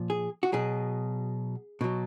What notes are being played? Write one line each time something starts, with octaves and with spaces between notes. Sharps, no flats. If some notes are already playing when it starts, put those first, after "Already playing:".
Already playing: A#2 F3
G#4
F#4
B2 F#3 G#4
B2 F#3